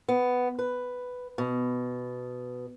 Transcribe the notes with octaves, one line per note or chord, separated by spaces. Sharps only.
B3
B4
B2